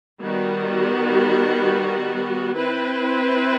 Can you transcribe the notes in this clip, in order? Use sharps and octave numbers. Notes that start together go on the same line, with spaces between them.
D#3 G3 B3 F#4
C4 E4 B4